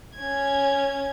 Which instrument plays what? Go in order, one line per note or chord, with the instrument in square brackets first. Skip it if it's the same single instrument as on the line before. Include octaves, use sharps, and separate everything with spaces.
[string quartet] C#4 G#6